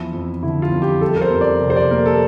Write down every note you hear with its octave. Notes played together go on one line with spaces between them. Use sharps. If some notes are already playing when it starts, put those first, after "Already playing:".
Already playing: E2 F3 E4
F2
D3 E4
F4
F2
G4
G3 A4
A#4
C5
F2
D5
C3
C5
D5
A#3 A#4
A4